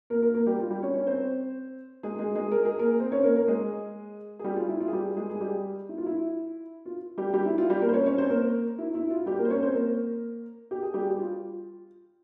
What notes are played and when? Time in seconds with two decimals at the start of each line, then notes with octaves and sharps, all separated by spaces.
0.10 A#3 A#4
0.22 A#3 A#4
0.34 A#3 A#4
0.46 G3 G4
0.59 F4
0.70 G3 G4
0.82 C#4 C#5
0.94 C#4 C#5
1.07 C4 C5
2.03 G#3 G#4
2.19 G#3 G#4
2.35 G#3 G#4
2.52 A#4
2.65 G#4
2.79 A#3 A#4
3.00 C4 C5
3.12 C#4 C#5
3.23 A#3 A#4
3.36 A#3 A#4
3.48 G#3 G#4
4.39 G#4
4.44 G3 G4
4.56 F4
4.69 E4
4.80 F4
4.88 G#4
4.93 G3 G4
5.17 G#3 G#4
5.30 G#4
5.41 G3 G4
5.89 E4
5.98 F4
6.06 E4
6.86 F4
7.18 G3 G4
7.34 G3 G4
7.46 E4
7.58 F4
7.70 G3 G4
7.82 A#3 A#4
7.89 C5
7.94 C#4 C#5
8.06 C#4 C#5
8.18 C4 C5
8.30 A#3 A#4
8.78 E4
8.95 E4
9.10 F4
9.26 G3 G4
9.38 A#3 A#4
9.45 C5
9.50 C#4 C#5
9.63 C4 C5
9.75 A#3 A#4
10.71 G4
10.82 G#4
10.94 G3 G4
11.10 G4
11.19 F4